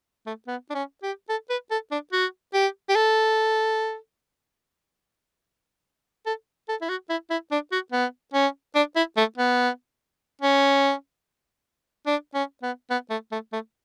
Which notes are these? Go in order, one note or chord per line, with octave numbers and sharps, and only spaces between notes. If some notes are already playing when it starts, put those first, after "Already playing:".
A3
B3
D4
C#4
G4
A4
B4
A4
D4
F#4
G4
G4
A4
A4
A4
E4
F#4
E4
E4
D4
F#4
B3
C#4
D4
E4
A3
B3
C#4
D4
C#4
B3
B3
A3
A3
A3